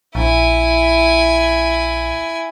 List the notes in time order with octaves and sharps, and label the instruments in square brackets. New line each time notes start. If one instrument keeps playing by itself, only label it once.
[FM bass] A#1 [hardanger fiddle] E4 G#5